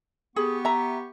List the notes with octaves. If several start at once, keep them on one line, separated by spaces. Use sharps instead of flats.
B3 G4 G#4 C#6
E5 A#5